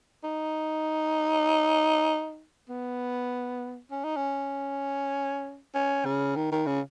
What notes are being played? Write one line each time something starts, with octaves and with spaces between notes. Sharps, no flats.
D#4
B3
C#4
D#4
C#4
C#4
C#3
D#3
D#3
C#3